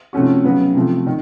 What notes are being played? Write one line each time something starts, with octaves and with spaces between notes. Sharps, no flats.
C3 F3 A3 C#4 F#4
C#3 F#3 B3
C3 F3 A3
D#3